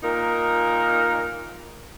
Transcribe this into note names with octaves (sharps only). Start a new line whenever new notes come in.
A#2 A#3 D#4 A#4